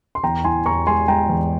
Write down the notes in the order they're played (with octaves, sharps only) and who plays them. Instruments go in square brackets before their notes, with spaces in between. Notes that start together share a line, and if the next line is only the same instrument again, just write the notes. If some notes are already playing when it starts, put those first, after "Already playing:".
[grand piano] C6
E2 G5 A#5
E3 G#5 C6
E2 A#5 C#6
G#3 G#5 C6
G#3 G5 A#5
E2